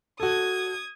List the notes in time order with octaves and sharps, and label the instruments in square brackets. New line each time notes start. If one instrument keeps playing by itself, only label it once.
[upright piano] F#4 A4 [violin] D#6 G#6